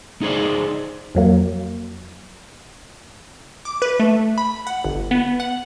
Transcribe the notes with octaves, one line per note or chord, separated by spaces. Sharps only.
D#4 G#4 C5 D5
F2 F#3 A#3
D6
B4
A3
B5
F#5
G1
B3
F#5